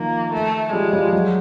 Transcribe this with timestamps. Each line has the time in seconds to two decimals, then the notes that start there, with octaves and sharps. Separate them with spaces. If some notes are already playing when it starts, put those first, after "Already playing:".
Already playing: D#3 F3 A#3
0.33 A3
0.72 F3 G3 G#3
0.93 F3 G3
1.13 F#3 G#3